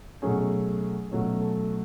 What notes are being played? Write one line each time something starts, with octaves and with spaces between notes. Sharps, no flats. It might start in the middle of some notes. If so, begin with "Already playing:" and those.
B2 F#3 A3 C#4 G#4
B2 F#3 A3 C#4
A4